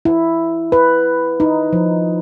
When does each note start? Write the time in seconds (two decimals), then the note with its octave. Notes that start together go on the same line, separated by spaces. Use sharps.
0.05 E4
0.72 B4
1.40 D#4
1.73 F3